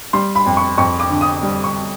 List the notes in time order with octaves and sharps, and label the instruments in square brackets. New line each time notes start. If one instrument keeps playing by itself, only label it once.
[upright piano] G3 C6
B5
F2
C#6
F2 C#6
D6
D3
D#6
G3
C#6